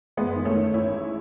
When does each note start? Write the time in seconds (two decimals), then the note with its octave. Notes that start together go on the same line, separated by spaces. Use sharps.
0.17 F#1 G#3 B3
0.36 D#3
0.45 A3 C#4
0.55 D#3
0.74 A1 C#4 E4
0.93 G#2